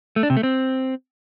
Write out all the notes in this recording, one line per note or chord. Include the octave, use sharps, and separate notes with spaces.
A3
D4
C3
A3
C4